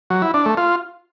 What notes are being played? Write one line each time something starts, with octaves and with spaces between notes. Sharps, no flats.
F#3
E4
D4
A3
F4